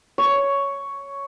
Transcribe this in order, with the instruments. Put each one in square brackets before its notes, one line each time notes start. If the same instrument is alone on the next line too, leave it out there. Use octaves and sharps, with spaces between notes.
[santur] C#5